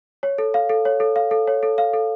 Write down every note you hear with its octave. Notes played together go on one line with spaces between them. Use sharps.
C#5
A4
F5
A4
C#5
A4
F5
A4
C#5
A4
F5
A4